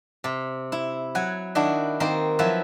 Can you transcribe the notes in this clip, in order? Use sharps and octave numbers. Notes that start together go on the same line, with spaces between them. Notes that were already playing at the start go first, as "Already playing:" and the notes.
C3
E4
F#3 F#5 G#5
D#3 D4 E4 F#4
D#3 A#3 C4 A#4
F3 F#3 E4 B4 E5